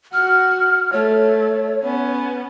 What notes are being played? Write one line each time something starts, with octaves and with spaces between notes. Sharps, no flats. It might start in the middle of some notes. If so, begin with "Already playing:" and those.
F#4 F#5 F6
A3 C#5
B3 C#4